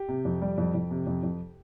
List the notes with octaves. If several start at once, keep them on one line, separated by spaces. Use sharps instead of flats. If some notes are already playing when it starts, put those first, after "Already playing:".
Already playing: G4
C3
F2
G3
F2
F2
C3
F2
F2